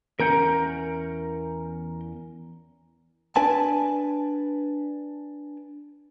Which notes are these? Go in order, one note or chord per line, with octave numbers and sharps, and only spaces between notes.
E2 C#4 A#4 F#5 A#5 G6
D4 B4 G#5 A5